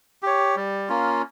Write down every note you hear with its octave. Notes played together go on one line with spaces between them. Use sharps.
G4 C#5
G3
A#3 C#4 F4